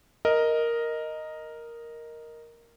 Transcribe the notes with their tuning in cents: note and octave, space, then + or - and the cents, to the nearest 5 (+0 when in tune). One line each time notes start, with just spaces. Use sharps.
A#4 +0 D#5 +0